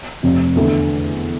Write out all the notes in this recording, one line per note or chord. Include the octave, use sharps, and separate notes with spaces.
F1 F2 C3
E2 D3 A3